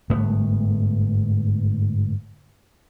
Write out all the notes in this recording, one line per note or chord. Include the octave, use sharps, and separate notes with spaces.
G1 G#2 A3 B3